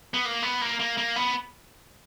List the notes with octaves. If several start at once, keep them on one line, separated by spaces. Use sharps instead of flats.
B3
A#3
B3
A#3
A#3
A#3
B3